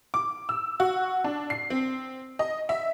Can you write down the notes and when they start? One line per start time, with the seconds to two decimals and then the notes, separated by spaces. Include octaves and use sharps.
0.14 D6
0.49 E6
0.80 F#4
1.24 D4
1.50 C7
1.70 C4
2.39 D#5
2.69 E5